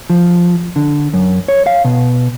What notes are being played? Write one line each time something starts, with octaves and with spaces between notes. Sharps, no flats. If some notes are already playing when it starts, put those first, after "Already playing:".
F3
D3
F#2
C#5
F5
B2